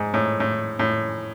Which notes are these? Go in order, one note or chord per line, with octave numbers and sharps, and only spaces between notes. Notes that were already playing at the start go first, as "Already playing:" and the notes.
Already playing: G#2
A2
A2
A2